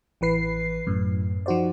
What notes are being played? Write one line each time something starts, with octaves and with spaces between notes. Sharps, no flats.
A1 E3 B4 C7
F#2 A2
F3 D#4 F#4 C5 D5